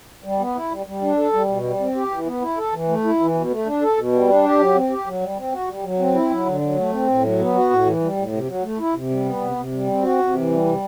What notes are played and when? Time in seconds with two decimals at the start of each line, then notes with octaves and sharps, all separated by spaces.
0.24 G3
0.39 B3
0.55 E4
0.71 G3
0.86 G3
1.02 D4
1.17 A4
1.33 G3
1.48 B2
1.64 G3
1.80 C4
1.95 G4
2.11 E3
2.26 B3
2.41 E4
2.57 A4
2.72 E3
2.88 A3
3.04 E4
3.20 E3
3.34 B2
3.50 A3
3.66 D4
3.82 A4
3.97 B2
4.13 G3
4.28 D4
4.44 G4
4.59 F#3
4.75 C4
4.90 G4
5.06 F#3
5.21 G3
5.37 C4
5.52 F#4
5.68 G3
5.84 F#3
5.99 C4
6.14 E4
6.30 F#3
6.46 D3
6.61 F#3
6.77 A3
6.92 C4
7.08 A2
7.23 F#3
7.39 B3
7.54 F#4
7.70 A2
7.85 E3
8.01 G3
8.17 A2
8.32 C3
8.48 F#3
8.63 A3
8.79 E4
8.94 C3
9.10 G3
9.25 B3
9.41 C3
9.56 C3
9.72 G3
9.88 C4
10.03 F#4
10.19 C3
10.34 E3
10.50 G3
10.65 C3